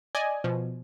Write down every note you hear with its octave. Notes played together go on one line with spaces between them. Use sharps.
D5 D#5 G#5
B2 F3